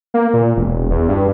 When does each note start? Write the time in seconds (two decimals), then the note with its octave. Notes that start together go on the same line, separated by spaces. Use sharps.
0.14 A#3
0.34 A#2
0.57 E1
0.91 E2
1.09 G2